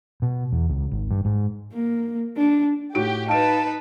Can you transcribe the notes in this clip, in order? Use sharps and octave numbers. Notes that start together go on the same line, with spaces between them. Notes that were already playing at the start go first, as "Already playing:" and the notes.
B2
E2
C#2
G#1
G2
G#2
A#3
D4
A2 F#4 G4 D7
D#4 B4 F5 A5 D7